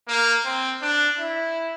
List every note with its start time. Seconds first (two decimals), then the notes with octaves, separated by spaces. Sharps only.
0.08 A#3
0.45 C4
0.82 D4
1.19 E4